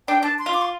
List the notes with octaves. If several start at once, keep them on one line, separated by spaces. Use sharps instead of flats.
D4 G5
D4 A5
C6
F4
D6
C6